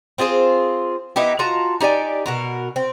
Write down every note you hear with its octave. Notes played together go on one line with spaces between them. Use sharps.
C4 F4 G#4 C5
B3 D#4 E4 G4
F4 F#4 A5 A#5
D#4 G4 D5 G#5
B2 F#4 A#4
C4